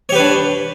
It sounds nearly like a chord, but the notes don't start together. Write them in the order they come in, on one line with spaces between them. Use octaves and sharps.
C#5 G4 B4 D4